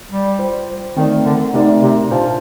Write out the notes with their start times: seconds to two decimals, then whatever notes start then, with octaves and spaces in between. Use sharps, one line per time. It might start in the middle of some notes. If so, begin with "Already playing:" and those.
0.10 G3
0.39 F4 C5 G5
0.97 D#3 A3 C4 D#4 A#4 D5
1.25 D3
1.53 C3 A3 C4 D#4 A#4 D5
1.82 C3
2.11 A#2 D4 F4 C5 F5 A5